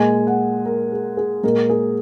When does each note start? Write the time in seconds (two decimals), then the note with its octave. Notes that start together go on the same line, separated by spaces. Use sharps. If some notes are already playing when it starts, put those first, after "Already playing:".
Already playing: A#2 G#3 G#5
0.27 F#5
0.66 A#4
0.92 G#4
1.17 G#4
1.43 A#2 G#3 A#4
1.70 G#4